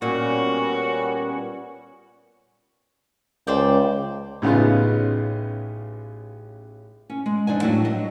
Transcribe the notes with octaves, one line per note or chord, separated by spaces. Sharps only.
A#2 G3 B3 C#4 F#4
C#2 C5 D5 G5
A1 C#3 B3 D#4 F4
C#4
G#3
F2 D4 D#4 G#5
A2 F#3 A3 D4 F#4 G4
F#3 D#5